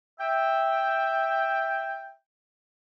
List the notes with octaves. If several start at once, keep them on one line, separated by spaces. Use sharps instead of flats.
E5 G5